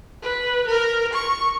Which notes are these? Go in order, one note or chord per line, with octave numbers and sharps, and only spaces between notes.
B4
A#4
C#6